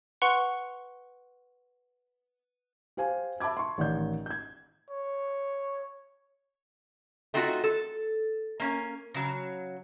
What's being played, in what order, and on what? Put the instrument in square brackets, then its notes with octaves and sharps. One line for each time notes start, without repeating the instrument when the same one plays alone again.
[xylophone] B4 F#5 C6 C#6 F#6 F7
[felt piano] G4 C5 F5 G#5
E5 A5 B5 D6 G#6
C6 C#6
A1 D#3 D5 G6
G6 G#6
[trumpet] C#5
[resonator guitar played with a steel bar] A3 C4 D#4 F4 F#4
A4
A#3 C#4
C#3 F#3